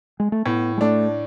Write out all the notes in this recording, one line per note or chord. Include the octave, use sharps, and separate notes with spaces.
G#3
A3
A2 B3
G#3
A3 D4